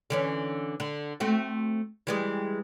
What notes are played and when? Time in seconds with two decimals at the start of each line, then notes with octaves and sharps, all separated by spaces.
0.10 D3 E3 C#4
0.80 D3
1.20 A3 C4 F#4
2.07 E3 G3 G#3